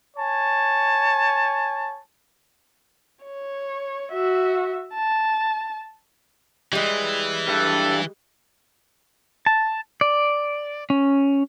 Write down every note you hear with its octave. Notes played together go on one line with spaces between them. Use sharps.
C#5 G#5 A5
C#5
F#4 E5
A5
E3 G3 G#3
G2 A4
A5
D5
C#4